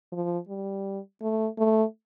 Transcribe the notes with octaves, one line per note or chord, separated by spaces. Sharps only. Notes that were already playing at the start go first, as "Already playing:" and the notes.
F3
G3
A3
A3